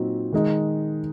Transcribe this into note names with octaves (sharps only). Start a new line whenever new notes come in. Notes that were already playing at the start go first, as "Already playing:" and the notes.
Already playing: A#2 F#3 C4 D#4
D#3 G#3 D#4